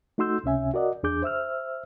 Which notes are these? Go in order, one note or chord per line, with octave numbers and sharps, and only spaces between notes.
A3 D#4 F#4 C6 E6 G6
C#2 C3 C#4 E5 G#5
F#4 A#4 D5 D#5 F#5
E2 D4 G#4 D6 G6
C5 E5 E6 F6